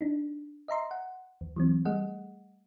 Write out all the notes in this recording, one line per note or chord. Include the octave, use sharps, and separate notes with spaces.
D4 D#4
D#5 E5 A#5 C6
F#5
D#2
E3 F#3 C4
G3 A3 G#4 D#5 F#5